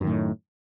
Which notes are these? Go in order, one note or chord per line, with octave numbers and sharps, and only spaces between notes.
F#2 A2 D#3